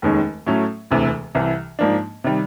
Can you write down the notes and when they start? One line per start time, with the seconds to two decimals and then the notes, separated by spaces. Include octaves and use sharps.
0.02 F1 D#2 D#3 G#3 C#4
0.47 A2 F#3 A3 C#4
0.91 E1 D2 C3 E3
1.35 C2 C3 E3
1.79 G#2 F3 A#3 D4
2.24 C3 D#3 G3